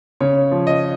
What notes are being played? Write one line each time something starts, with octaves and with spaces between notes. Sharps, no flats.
C#3 C#5
F3
D#5